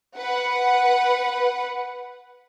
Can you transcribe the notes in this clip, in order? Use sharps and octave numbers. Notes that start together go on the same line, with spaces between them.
B4 F#5